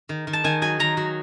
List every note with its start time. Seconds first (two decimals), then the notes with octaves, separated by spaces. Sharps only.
0.09 D#3
0.27 D#3
0.33 A5
0.44 D#3 G#5
0.62 F#3 G#5
0.79 D#3 A#5
0.97 F#3